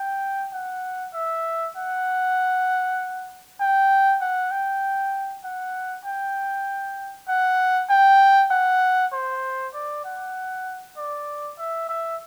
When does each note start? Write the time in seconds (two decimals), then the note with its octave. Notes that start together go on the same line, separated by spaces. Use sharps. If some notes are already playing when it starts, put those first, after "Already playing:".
Already playing: G5
0.53 F#5
1.13 E5
1.76 F#5
3.60 G5
4.21 F#5
4.51 G5
5.43 F#5
6.05 G5
7.28 F#5
7.89 G5
8.51 F#5
9.13 C5
9.74 D5
10.04 F#5
10.97 D5
11.58 E5
11.89 E5